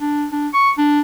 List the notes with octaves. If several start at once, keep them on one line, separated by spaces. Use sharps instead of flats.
D4
D4
C#6
D4